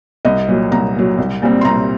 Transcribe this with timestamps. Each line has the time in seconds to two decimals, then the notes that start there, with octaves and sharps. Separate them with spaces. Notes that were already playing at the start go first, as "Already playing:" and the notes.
0.25 C2 D#5
0.48 A#2 F#3
0.71 C2 A#5
0.95 A#2 F#3
1.18 C2
1.42 A#2 G3 C4
1.61 C6
1.65 C2 A#5